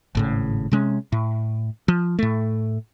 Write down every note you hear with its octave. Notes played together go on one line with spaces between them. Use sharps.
G#1 A2 C#3
C3 G#3 C#4
A2
F3
A2 A3